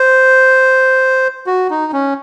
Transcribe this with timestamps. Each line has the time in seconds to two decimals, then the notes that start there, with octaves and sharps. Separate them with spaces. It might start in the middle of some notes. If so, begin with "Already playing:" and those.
Already playing: C5
1.46 F#4
1.70 D#4
1.93 C#4